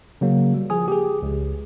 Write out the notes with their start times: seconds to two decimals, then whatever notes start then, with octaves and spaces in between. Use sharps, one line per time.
0.21 C#3 F#3 A#3
0.54 G3
0.70 F3 G#4 G#5 D#6
0.88 G4 G#4
1.22 C#2